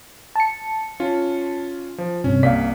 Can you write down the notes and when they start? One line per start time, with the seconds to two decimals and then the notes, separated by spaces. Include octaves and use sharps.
0.36 A5 C#7
1.00 C#4 F4
1.98 F3
2.24 G2 C3 C#4
2.43 C2 A#3 D5 F5 B6